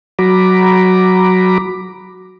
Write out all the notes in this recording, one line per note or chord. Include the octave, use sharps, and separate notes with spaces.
F#3 F#4 A#5 B5 D6